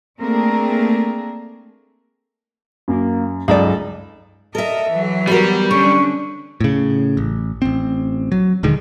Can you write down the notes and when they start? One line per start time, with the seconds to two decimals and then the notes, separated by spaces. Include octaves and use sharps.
0.19 A3 A#3 C4 D4 G#4 A#4
2.88 F#2 A#3
3.48 C#2 G2 F#3 D#4 G#4 A4 D5
4.55 A4 A#4 D#5 E5
4.89 E3 F#3
5.27 G3 B3 F#4 A#4
5.71 D3 C#4 D4 C#6
6.61 A2 C#3
7.17 A1
7.62 A1 C4
8.32 F#3
8.63 D#1 D3 D#3 G#3